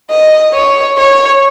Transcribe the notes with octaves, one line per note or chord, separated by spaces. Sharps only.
D#5
C#5
C#5